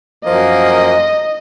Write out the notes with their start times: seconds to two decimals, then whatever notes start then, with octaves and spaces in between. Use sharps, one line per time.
0.24 F#2 F3 A#3 D#5